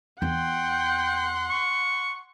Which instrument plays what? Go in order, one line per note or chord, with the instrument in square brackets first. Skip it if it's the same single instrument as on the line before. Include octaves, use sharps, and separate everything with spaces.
[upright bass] E2 E4 [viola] F#5 C6 [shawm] G5
[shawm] C#6